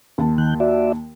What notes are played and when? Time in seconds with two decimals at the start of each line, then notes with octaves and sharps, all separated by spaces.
0.18 D#2 A5
0.38 D#3 F#6 G6
0.60 F#4 D5 E5